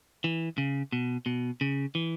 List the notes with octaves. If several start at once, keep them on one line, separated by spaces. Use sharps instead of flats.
E3
C#3
B2
B2
C#3
E3